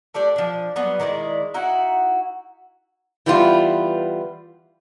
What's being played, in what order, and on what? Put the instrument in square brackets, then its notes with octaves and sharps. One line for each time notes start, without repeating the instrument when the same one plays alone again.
[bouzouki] A3 D4 G4 D5
F3 D4
F#3 G3 B3
D#3 G#3 E4 D5
D#4 E4 F#4 F#5
[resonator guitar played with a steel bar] E3 G3 B3 F4